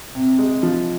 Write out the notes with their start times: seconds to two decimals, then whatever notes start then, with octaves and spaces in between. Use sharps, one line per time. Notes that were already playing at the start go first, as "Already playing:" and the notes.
0.15 C3
0.39 G#3
0.63 F3